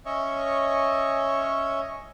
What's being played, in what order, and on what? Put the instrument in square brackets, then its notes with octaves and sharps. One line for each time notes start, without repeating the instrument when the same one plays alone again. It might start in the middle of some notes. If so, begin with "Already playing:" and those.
[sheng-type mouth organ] C#4 C#5 D#5 E5 C#6